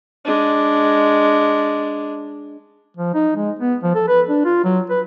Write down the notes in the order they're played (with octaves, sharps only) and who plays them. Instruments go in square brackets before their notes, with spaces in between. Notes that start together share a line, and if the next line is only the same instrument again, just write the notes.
[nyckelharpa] G#3 D4
[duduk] F3
D#4
G#3
B3
F3
A4
B4
D4
F4
F#3
B4